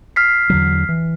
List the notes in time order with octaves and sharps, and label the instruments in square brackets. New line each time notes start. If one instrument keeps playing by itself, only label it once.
[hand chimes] F6 B6 C7
[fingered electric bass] E2 D3 F#3
E3